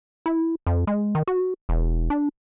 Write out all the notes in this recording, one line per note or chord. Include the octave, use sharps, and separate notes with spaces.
E4
F2
G#3
D#3
F#4
E1
D4